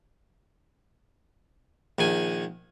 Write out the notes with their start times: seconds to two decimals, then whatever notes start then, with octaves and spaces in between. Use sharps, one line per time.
1.99 A#1 D#3 G#5